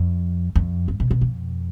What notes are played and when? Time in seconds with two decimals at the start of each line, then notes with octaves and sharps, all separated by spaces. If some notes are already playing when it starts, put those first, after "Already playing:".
Already playing: F2
0.56 F2
0.88 G2
1.00 B2
1.11 B2
1.21 F2